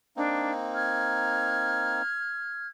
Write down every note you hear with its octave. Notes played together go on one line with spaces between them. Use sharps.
A#3 C4 D4 D#4
F6 G#6